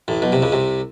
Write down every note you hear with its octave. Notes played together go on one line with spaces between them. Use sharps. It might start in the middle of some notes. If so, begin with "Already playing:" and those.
A1 A2
B1 B2
C2 C3
C#2 C#3
C2 C3